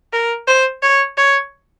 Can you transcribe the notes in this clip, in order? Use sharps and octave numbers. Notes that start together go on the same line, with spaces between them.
A#4
C5
C#5
C#5